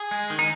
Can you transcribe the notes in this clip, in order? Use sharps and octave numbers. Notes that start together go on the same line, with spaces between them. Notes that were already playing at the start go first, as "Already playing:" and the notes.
Already playing: G#4
G#3
D#3
D#4